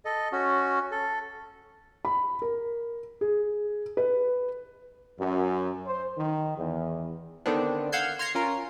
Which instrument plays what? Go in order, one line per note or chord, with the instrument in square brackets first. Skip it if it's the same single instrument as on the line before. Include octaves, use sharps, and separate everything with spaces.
[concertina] A4 D#5
C#4 F#4
A4
[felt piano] B5
A#4
G#4
B4
[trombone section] F#2
C5
D#3
E2
[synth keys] D3 D#3 B3 C4 D4
F5 F#5 E6 G6 G#6 C7
C6 F6 G#6 A#6 C7 C#7
C#4 F4 A#4